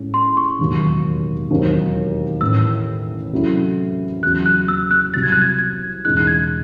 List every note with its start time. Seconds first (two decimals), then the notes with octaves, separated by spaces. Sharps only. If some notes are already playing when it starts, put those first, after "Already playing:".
Already playing: A2 G#3 C#4
0.14 C6
0.37 C#6
0.59 E1 D#2 D#3 F#3
1.50 E1 D#2 D#3 F#3 C4
2.41 A1 A2 E3 E6
3.33 C3 F#3 A3 C#4 E4
4.22 E2 C#3 F#3 F#6
4.46 F#6
4.68 E6
4.91 F#6
5.13 C2 C3 F#3 A6
5.23 G#6
5.32 F#6
5.42 G#6
5.59 G#6
6.05 E1 E2 C#3 G#3 D#4 F#6
6.17 F#6
6.27 G#6